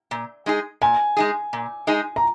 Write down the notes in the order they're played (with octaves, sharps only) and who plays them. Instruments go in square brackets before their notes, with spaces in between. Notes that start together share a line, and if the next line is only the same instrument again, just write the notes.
[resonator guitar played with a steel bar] A#2
G#3 D#4 G#4
[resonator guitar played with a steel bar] A#2 [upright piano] G#5
[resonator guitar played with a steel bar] G#3 D#4 G#4
A#2
G#3 D#4 G#4
[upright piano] A#5